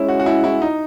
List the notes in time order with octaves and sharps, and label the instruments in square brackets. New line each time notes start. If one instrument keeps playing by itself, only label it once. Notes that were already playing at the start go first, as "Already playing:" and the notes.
Already playing: [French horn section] G#3 C#4 G#4 C#5 [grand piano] E4
[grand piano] F#4
F#4
E4
E4
D#4